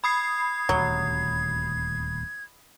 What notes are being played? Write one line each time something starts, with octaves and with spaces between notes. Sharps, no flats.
B5 D#6 G#6 C7
D#1 D2 F#3